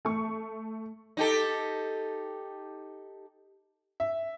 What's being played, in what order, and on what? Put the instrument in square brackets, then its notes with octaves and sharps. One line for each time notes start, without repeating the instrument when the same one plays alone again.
[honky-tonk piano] A3 C#6
[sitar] D#4 G4 A4
[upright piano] E5